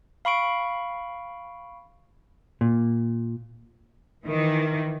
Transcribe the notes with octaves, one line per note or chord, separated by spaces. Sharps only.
F5 B5 C#6 D7
A#2
D#3 E3